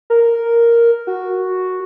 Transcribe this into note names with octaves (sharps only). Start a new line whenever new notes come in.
A#4
F#4